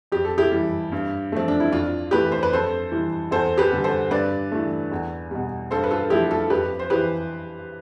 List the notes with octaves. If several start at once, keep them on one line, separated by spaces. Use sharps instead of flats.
F2 G4
A4
E4 G4
E3 G3
G2
F3 A3 C4
D4
E4
F2 D4 F4
E3 A3 G4 B4
C5
B4
F2 A4 C5
E3 G3
E2 A4 C5
G4 B4
D3 G3
A4 C5
G2 B4 D5
E3 A3
E2
B2 G3
G2 A4 C5
B4
F4 A4
F3 A3 E4 G4
F4 A4
F2 G4 B4
C5
E3 G4 B4